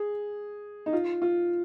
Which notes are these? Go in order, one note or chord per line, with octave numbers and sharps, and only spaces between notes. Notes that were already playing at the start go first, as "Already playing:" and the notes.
Already playing: G#4
D#4
F4
F4